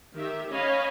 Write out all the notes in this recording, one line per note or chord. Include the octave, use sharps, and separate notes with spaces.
D#3 G4 E5
C#4 C#5 D#5 F5 G#5 B5